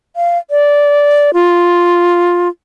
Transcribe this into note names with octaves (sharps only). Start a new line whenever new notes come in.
F5
D5
F4